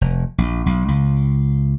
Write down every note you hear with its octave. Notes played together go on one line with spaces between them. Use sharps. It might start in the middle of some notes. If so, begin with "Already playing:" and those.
F1
A#1
B1
C#2